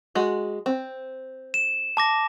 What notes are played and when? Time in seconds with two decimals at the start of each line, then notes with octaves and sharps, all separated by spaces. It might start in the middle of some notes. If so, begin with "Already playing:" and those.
0.15 G#3 F#4
0.66 C4
1.54 E7
1.97 A5 D6 A#6